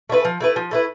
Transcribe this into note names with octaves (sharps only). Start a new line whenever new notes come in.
A3 E4 B4
F3
A3 E4 B4
F3
A3 E4 B4